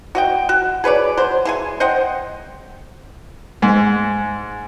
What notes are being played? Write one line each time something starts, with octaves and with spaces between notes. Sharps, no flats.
F#4 D#5 G5
F#4
G#4 B4 C#5 D5
F#3 C5
E3 G#4 G#5
C5 D#5 F#5 G5
G#2